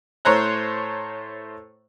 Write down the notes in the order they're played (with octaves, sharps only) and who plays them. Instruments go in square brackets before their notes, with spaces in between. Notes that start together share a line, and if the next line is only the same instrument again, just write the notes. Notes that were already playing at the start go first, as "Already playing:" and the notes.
[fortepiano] A2 A3 C5 C#5 A#5 F#6